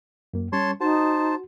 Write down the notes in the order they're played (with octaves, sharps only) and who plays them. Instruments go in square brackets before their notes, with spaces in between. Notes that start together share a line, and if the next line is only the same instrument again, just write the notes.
[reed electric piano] F#2 A#3
[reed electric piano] G3 C#4 [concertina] C#5 A5 C6
[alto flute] D#4 [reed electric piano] F#4 [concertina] C5 A5